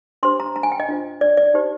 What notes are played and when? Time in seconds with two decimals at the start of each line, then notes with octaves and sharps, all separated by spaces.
0.23 D4 G4 C5 C6
0.40 A#5
0.56 A#5
0.63 G#5
0.72 G5
0.80 D#5
0.89 D4 F4 C5
1.21 D5
1.37 D5
1.54 D#4 G4 C5